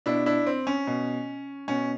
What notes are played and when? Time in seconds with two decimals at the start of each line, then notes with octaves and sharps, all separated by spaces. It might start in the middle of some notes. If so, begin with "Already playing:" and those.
0.06 B2 D4 E4
0.26 D4 E4
0.46 C4
0.67 C#4
0.87 B2
1.68 B2 C#4